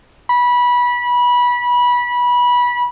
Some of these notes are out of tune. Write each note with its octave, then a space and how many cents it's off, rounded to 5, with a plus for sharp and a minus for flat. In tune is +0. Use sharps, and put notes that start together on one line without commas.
B5 -20